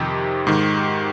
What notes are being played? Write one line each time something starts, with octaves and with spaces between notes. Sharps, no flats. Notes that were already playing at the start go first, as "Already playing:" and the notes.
Already playing: F2 C3 D#3 G4
G#2 D#3